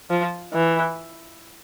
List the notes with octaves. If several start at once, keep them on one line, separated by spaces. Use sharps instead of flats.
F3
E3